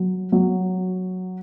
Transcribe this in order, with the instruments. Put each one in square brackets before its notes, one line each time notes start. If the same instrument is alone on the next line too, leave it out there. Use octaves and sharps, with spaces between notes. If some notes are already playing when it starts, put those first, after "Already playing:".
Already playing: [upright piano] F#3
F#3